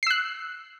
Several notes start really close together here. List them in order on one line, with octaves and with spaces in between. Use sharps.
C7 E6 F#6